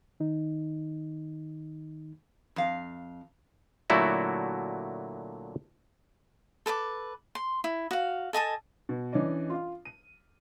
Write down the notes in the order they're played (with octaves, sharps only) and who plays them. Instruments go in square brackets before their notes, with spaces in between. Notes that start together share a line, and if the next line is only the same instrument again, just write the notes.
[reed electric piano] D#3 D#4
[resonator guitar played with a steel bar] F2 F5
[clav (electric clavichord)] A#2 D3 F#3 A3 E4 F#4
[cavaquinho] A4 B4 A5 D6
C6
E4
F#4 F5
A4 D#5 G#5 A5
[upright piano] B2
E3 C#4 D4 D5 D#5
F4 F5
D#7